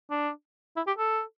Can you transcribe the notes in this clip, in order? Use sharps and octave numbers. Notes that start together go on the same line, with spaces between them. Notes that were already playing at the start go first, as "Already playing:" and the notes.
D4
E4
G4
A4